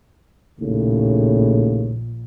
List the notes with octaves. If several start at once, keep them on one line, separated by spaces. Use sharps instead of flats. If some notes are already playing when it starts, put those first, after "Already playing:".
A#1 D#2 A2 C#3